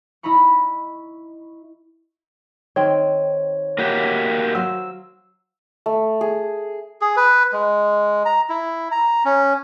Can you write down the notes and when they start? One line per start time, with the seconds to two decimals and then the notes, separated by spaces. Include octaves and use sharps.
0.23 E4 D#5 A#5 B5 C#6
2.76 D#3 C4 C#5
3.78 A#3 F#4 G4
4.55 F#3 C5 F5 E6
5.86 A3
6.21 G#4
7.01 G#4
7.16 B4
7.53 G#3
8.25 A#5
8.49 E4
8.92 A#5
9.25 C#4